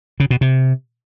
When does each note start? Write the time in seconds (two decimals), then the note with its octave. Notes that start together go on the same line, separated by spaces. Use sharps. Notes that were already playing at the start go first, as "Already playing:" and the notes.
0.20 C#3
0.30 B2
0.41 C3